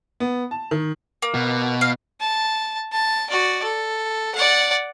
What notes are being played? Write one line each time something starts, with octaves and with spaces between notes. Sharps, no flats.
B3
A5
D#3
A#3
B2
F5
A5
A5
F#4 D5
A4
D5 F#5